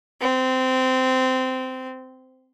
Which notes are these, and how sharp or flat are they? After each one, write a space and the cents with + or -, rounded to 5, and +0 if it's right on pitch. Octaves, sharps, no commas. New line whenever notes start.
C4 -15